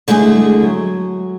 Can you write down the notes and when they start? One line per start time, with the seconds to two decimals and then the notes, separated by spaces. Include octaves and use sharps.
0.08 D3 G#3 A3 E4 G#4
0.35 G#3
0.62 F#3